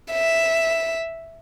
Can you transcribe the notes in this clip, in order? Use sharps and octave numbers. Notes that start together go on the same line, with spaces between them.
E5